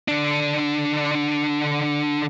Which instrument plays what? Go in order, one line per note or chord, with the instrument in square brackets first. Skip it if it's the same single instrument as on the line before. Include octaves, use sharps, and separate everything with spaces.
[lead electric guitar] D3 D4